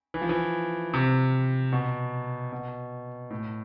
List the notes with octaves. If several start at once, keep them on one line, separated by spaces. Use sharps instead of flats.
E3
F3
E3
C3
B2
B2
A2